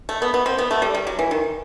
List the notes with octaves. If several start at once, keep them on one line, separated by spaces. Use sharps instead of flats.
A3
B3
B3
C4
B3
A3
G3
G3
F#3
E3
D#3